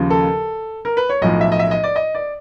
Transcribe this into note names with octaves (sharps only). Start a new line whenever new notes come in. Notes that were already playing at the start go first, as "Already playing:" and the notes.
Already playing: D#2 C#3 F3
A4
A#4
B4
C#5
B1 A2 F3 D#5
E5
D#5
E5
D#5
D5
D#5
D5